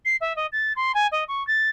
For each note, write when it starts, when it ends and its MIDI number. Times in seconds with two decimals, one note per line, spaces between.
0.05 0.16 96
0.21 0.35 76
0.36 0.46 75
0.52 0.73 93
0.76 0.92 84
0.94 1.07 80
1.11 1.24 75
1.28 1.45 85
1.47 1.69 93